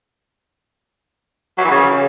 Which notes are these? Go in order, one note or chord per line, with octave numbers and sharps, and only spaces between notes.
F#3
E3
C#3